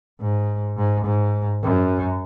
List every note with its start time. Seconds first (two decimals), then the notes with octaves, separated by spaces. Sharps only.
0.21 G#2
0.77 G#2
1.05 G#2
1.63 F#2